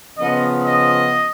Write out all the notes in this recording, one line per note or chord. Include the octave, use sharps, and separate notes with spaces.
C#3 F3 B3 D#5
D#5